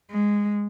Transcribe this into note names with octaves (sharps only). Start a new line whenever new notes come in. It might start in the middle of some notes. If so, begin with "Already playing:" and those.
G#3